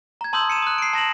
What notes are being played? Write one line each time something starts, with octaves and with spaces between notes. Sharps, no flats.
A#5 G#6
A5 C6 D#6 E6 G6 F#7
C#7 D#7 E7
D#6 F#6
C7 D7
A5 A#6 E7 F#7